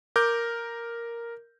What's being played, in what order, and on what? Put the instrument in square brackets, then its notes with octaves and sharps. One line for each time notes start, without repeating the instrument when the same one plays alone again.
[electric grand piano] A#4 D6 G6